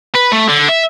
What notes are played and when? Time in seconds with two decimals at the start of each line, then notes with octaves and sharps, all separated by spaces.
0.15 B4
0.33 A3
0.49 D3
0.69 E5